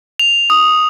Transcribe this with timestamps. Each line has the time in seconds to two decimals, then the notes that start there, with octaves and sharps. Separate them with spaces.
0.19 F7
0.50 D#6